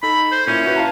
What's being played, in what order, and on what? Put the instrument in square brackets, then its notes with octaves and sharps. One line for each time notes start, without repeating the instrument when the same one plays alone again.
[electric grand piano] D#4 A4 [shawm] B5
[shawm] C5
[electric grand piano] A#2 E4 [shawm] C#4
[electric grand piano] E4 F#4 B4
F5 A5 A#5